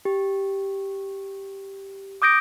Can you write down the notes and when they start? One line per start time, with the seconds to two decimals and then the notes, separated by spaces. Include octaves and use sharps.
0.05 G4
2.22 D6 D#6 G6 A#6 D7